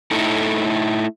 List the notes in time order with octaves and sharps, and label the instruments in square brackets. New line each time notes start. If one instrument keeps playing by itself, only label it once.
[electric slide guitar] A3 D#4 E4 A4